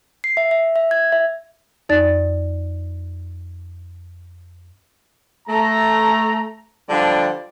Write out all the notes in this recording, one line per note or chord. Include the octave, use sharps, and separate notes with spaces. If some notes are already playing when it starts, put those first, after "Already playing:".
C7
E5
E5
E5
G#6
E5
F2 D#4 D5 A6
A3 A#5
D3 F3 G3 D4